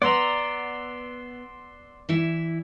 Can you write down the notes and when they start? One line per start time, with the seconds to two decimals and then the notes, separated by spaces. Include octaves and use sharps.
0.02 B3 D5 F#5 A#5 C6 E6
2.09 E3 E4 E5